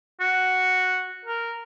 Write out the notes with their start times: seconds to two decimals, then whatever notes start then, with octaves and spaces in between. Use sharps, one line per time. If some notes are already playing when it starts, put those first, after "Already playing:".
0.20 F#4
1.25 A#4